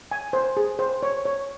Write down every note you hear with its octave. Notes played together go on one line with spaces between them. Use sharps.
G#5
C5
G#4
C5
C#5
C#5